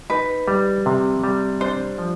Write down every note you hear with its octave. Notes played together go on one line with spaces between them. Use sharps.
D#4 B4
G3
C3
G3
D4 C5
F3